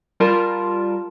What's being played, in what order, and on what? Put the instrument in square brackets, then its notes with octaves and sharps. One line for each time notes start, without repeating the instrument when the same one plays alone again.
[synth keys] G3 F4 A#4 A5